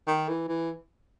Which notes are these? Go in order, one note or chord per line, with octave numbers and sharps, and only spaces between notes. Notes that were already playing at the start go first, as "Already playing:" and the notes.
D#3
E3
E3